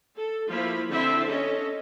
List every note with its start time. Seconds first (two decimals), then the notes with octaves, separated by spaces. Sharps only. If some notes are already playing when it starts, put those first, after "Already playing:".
0.17 A4
0.49 F3 A#3 E4 F4 B5
0.89 D3 C4 E4 E5 A5 C6
1.29 C#4 A4 D#5